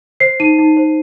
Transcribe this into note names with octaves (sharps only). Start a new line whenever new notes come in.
C5 C7
D#4 D#7
D#4
C5